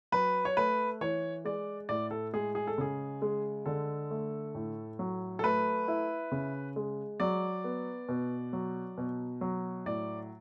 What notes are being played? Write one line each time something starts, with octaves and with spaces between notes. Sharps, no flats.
F#3 B4
C#5
A3 B4
E3 C#5
G#3 D5
A2 D5
A4
G#3 G#4
G#4
A4
C#3 G#4
G#3
D3 A4
A3
A2
F#3
A4
A3 B4
E4
C#3
G#3
F#3 D5
B3
B2
F#3
B2
F#3
A2 D5